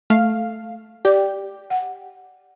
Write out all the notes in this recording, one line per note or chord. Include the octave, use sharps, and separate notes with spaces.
A3 F5
G4 D5
F#5